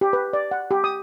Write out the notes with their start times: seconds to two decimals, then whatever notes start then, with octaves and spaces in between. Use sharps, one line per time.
0.01 G4
0.13 B4
0.33 D5
0.51 F#5
0.71 G4
0.84 D#6